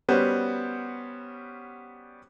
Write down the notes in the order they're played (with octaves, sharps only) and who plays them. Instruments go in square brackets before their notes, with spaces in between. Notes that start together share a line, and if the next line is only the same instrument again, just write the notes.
[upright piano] G3 B3 C#4 F#4 C5